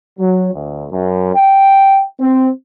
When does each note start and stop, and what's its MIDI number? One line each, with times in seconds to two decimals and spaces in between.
0.18 0.51 54
0.54 0.85 38
0.91 1.34 42
1.35 2.03 79
2.19 2.48 60